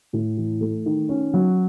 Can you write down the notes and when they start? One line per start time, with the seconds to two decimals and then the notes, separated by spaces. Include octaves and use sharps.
0.13 A2
0.37 E3
0.61 A3
0.86 D#3
1.09 C#4
1.34 F#3